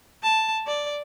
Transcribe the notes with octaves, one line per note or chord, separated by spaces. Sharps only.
A5
D5